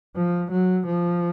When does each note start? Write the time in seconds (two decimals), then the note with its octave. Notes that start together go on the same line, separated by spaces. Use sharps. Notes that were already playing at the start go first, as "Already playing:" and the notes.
0.16 F3
0.51 F#3
0.86 F3